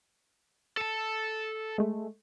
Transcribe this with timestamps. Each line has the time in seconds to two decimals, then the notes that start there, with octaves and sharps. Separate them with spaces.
0.77 A4 A5
1.78 G#3 A3